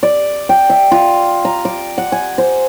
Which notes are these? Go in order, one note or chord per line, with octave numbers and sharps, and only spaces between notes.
D5
G5
E5
F4
A#5
D6
F#5
G#5
C5